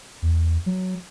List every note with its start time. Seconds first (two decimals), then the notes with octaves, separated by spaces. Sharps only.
0.22 E2
0.66 F#3